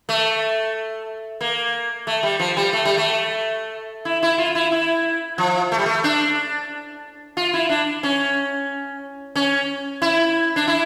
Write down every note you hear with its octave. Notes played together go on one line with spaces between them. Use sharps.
A3
A#3
A3
G3
F3
G3
A3
G3
A3
E4
E4
F4
E4
E4
F3
A3
G3
A3
D4
F4
E4
D4
C#4
C#4
E4
D4
E4